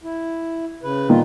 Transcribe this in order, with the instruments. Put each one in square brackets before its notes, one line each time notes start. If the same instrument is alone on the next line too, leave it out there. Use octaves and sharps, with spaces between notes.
[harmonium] E4
C#3 B4
[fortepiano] A#2 D#3 [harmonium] F4